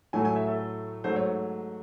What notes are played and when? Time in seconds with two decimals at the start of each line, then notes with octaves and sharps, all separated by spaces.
0.13 A2 F#3 A3 G#5
0.25 G#5
0.36 E5
0.48 A4
1.04 G#2 F#3 A3 C5
1.16 C#5